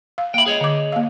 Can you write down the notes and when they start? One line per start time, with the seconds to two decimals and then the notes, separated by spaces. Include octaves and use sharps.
0.18 F5
0.34 A#3 E5 G5 B5
0.46 G#4 C#5 D#5
0.61 D3 D6
0.92 A#3 F5